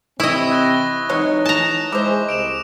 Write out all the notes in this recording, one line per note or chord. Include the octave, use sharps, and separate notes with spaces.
C3 E3 C4 E4 D#5 E5 C#6 D#6
F#6 A#6 G7
E3 F#3 G#3 D#4 C#5
A5 A#5
G#3 E4 C5 D6
C2 D7 E7 F7